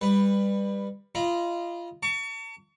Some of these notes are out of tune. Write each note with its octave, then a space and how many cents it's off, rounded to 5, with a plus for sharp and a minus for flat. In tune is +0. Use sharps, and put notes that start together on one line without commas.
G3 +25 B4 +0
F4 -20 D#5 +0 B5 -30
A5 +45 C#6 +30